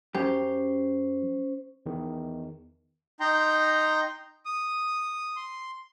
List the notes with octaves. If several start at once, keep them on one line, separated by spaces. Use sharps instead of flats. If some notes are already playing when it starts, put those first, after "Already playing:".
F#2 C#4 G4 C5
E2 D#3
D#4 G5 A#5 C6
D#6
C6